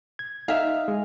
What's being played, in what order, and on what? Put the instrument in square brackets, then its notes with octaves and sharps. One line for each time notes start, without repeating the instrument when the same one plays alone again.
[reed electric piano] G#6
[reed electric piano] D#4 [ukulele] E5 F5
[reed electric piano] G#3